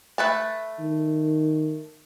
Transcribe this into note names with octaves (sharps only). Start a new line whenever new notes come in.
A3 B4 A5
D#3